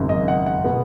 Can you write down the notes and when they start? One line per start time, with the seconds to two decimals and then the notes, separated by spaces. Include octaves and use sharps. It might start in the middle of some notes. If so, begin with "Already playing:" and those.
Already playing: G#1 F#2 C#3
0.09 D#5
0.28 F#5
0.46 F#5
0.65 B2 B3